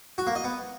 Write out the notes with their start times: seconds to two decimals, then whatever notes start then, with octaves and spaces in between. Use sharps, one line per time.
0.18 F#4
0.27 A#3
0.35 D#5
0.44 B3